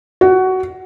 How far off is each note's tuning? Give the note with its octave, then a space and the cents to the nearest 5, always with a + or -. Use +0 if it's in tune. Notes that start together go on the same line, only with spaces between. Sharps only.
F#4 +15